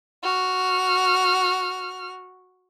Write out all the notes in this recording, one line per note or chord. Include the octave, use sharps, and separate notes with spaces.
F#4 F6